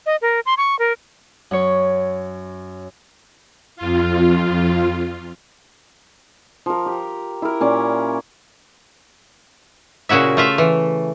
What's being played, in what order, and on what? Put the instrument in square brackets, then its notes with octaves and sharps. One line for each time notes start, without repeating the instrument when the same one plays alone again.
[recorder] D#5
A#4
C6
C#6
A#4
[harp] F#2 C#5
[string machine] F2 F4
[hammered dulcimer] F3 A#4
G4
E4 A#4
A#2 C#4 D5
[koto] A#2 C#3 E4 F#4 E5
A3 F4 E5
E3